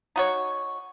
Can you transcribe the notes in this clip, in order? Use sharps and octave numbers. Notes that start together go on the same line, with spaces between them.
D#4 F#4 C#5